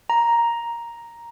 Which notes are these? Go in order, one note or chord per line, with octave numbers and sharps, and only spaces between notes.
A#5